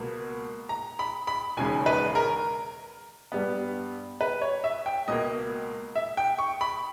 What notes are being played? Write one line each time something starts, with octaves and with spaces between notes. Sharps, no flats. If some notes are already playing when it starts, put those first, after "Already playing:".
Already playing: C#2 B2 A#3
A#5
B5
B5
E1 D#2 C#3 G#3 G#5
B4
A#4
G2 G3 B3
B4
C#5
E5
G5
C#2 B2 A#3 D#5
E5
G5
C#6
B5